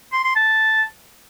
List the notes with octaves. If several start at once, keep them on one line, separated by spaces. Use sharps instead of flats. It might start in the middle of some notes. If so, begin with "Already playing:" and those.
C6
C6
A5